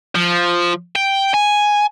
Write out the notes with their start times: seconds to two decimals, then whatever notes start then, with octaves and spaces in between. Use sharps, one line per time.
0.15 F3
0.96 G5
1.34 G#5